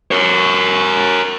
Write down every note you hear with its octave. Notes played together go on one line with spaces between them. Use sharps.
A#4 C#5